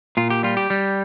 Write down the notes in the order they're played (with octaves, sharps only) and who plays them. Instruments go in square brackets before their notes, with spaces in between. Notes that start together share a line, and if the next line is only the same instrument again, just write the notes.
[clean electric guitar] A#2 F4
G4
G3 F4
G4
G3